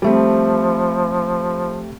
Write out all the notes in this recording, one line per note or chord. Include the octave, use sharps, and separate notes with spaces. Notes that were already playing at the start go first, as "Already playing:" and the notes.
F3 G3 A3 C4